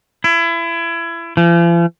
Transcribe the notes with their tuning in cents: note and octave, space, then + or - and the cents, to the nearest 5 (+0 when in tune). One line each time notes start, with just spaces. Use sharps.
E4 +30
F3 -45